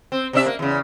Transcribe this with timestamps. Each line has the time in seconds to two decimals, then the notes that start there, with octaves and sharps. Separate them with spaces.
0.12 C4
0.33 C3 D4 E5
0.46 A#3
0.59 E2 C#3